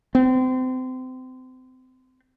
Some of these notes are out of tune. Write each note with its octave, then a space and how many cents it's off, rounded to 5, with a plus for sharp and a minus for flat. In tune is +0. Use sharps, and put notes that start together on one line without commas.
C4 -30